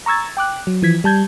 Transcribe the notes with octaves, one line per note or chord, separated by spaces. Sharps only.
A#5 C#6 E6 G#6 A6
G5 D6 F#6
F#3
E3 F3 G#6 B6
G3 A5 G6 G#6